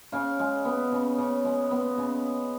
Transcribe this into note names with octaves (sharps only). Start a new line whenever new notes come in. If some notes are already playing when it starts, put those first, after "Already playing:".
C#3 F5
G#3
B3
C#3
C#3
G#3
B3
C#3